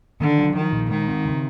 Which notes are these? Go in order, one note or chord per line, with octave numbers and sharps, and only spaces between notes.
D3 D#3
F#3
D#3 F3
A#2
D#3 G#3
C4
C#3